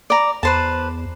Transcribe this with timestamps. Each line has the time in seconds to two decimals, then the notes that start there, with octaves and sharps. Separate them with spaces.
0.10 D5 A#5
0.43 E2 B4 C5 A5